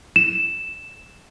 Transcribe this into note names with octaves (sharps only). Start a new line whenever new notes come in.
E7